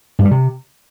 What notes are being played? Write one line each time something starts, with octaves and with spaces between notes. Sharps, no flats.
G2
G3
C3